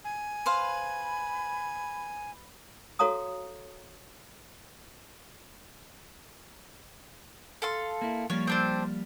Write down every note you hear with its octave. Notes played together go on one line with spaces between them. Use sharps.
G#5
B4 C5 F5 B5
F#4 A4 C#5 F5 A#5 D#6
A4 F5 C6
A#3 E4
F3 G3 A#3 C#5
C4 D4 C5